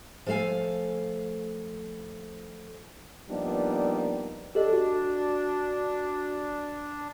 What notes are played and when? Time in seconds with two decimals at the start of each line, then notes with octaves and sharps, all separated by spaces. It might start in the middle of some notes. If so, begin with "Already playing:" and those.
0.26 F3 A3 A4 F5 G#5
3.30 F3 G3 A#3 B3 D4 D#4
4.55 D4 G4 A4 D#5
4.73 F#4